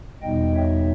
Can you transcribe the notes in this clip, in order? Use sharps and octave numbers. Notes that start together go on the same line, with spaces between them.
E2 B2 G3 B3 D#4 D#5 G5
C#5 E5